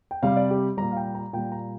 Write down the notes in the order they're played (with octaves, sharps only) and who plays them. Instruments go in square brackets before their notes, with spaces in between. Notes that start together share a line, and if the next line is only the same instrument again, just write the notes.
[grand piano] G5
C3 G3 F5
D5
G4
A#2 G3 A#5
F5
G5
A#5
A#2 G3 G5
A#5